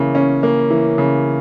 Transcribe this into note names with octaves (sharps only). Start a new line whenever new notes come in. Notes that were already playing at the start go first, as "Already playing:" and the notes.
Already playing: C#3 E3 A#3
C#4
A#3
E3
C#3